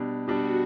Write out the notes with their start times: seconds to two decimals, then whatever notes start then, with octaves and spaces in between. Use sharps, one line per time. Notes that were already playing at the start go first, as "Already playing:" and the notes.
Already playing: B2 G3 D4
0.27 B2 G3 D4 F#4